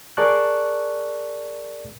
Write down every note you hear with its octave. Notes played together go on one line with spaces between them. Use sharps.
G#4 A#4 D5 A5 C#6 F#6